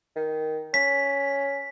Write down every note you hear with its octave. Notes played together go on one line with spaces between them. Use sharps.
D#3
C#4 B6